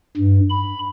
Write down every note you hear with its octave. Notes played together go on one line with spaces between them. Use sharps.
G2
B5